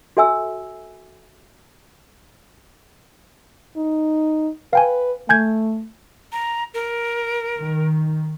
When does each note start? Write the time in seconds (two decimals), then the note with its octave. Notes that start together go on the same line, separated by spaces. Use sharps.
0.17 F#4 A4 E5 G#5 E6
3.77 D#4
4.73 B4 F5 G5 G#5
5.29 A3 G#5 G6 G#6
6.32 A#5
6.74 A#4
7.58 D#3